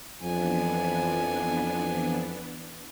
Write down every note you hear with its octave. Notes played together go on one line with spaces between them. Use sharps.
F2 E3 F3 B3 D4 G#5